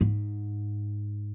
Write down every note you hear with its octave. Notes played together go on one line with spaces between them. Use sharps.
G#2